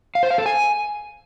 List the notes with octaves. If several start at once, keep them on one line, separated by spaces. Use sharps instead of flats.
F5
C5
F5
A4
G#5